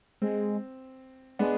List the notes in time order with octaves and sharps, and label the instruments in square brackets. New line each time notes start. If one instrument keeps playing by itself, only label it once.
[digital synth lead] G#3 [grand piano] C4
[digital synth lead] G#3 [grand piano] B3 D4